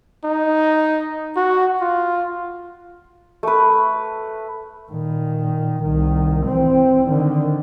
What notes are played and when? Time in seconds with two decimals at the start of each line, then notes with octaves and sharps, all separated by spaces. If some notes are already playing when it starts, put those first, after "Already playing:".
0.24 D#4
1.37 F#4
1.81 F4
3.43 A3 B4
4.91 A#2 D#3
5.83 C2 D#3
6.46 E3 C4
7.09 D3 D#3